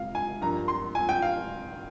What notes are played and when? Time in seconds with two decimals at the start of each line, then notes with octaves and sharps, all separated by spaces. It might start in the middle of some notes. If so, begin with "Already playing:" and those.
Already playing: C3 G#3 F5
0.15 G#5
0.41 G2 F3 A#3 A#5
0.68 C6
0.95 G#5
1.09 G5
1.22 F5